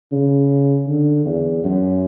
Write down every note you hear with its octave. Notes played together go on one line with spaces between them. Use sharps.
C#3
D3
E2
F#2